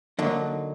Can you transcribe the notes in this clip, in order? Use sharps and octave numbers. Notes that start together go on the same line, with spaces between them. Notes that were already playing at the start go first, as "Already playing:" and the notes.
D3 F#3 A#3 D#4